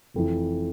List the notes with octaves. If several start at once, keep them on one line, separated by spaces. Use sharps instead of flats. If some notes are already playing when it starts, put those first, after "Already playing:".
F1 F2 E3